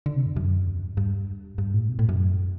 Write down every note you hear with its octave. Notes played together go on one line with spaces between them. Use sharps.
D3
C3
F#2
F#2
E2
G2
G2
G2
A2
B2
A2
F#2